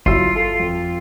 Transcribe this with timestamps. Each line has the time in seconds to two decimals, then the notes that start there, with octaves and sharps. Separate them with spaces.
0.06 G1 F#3 E4 F4 E6
0.36 A4
0.60 F2